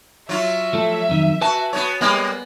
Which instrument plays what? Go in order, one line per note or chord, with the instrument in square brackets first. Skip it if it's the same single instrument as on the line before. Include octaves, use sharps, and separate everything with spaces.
[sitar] F#3 F4 [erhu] E5
[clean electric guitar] F3 A3 A4
F2 D#3 F#3
[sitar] F#4 [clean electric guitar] B4 G#5 A5
[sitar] B3 F#4 C#5
[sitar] G3 G#3 A#3 [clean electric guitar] B3